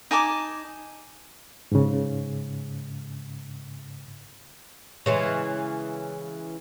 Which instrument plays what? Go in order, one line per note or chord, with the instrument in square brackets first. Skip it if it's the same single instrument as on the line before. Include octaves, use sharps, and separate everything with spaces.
[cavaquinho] D#4 G#5 A5 D6
[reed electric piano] G#2 C#3
[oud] C#3 E3 G#3